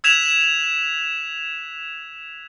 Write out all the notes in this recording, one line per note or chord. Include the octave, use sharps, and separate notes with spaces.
E6 F#6 G#6 B6 E7 F7